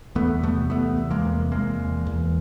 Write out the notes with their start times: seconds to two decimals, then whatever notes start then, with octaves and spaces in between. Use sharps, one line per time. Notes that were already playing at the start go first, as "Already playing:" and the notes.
0.15 E2 A3 B3
0.43 C3 A3 B3
0.70 E2 A3 B3
0.97 E2
1.10 G#3 A#3
1.25 C3
1.52 E2 G#3 A#3
1.79 E2
2.06 E2